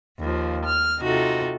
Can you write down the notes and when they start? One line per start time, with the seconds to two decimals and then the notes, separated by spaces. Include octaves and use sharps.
0.21 D#2 F3
0.64 F6
1.00 C3 D#4 F4 F#4 A4